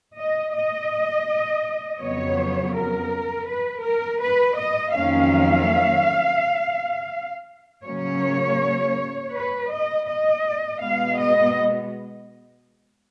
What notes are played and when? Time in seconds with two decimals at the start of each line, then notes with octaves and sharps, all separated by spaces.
0.18 D#5
0.55 D#5
2.00 F2 C#3 F#3 B3 C#5
2.74 A#4
3.47 B4
3.83 A#4
4.21 B4
4.57 D#5
4.94 F2 D#3 F#3 A#3 C#4 F5
7.86 C#3 F#3 A#3 C#4 C#5
9.33 B4
9.70 D#5
10.07 D#5
10.79 B2 G#3 B3 F5
11.16 D#5